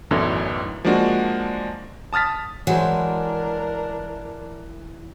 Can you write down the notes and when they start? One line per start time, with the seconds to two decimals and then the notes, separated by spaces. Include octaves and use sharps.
0.11 B1 F#2 A2 D3 E3
0.85 F3 G#3 A#3 D4 F#4
2.13 A5 D#6 F6 A6 B6
2.67 E3 F#3 G#3 D4 A#4 C5